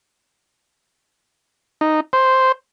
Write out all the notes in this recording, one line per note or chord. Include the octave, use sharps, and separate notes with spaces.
D#4
C5